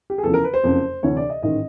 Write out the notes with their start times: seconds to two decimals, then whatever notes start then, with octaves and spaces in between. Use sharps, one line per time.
0.10 G4
0.18 G#4
0.23 E2 C#3 F3 A4
0.34 A#4
0.44 B4
0.54 C5
0.64 F#1 F2 C#3
1.03 D2 C3 E3 C#5
1.17 D5
1.29 D#5
1.42 A1 G#2 D#3 D#5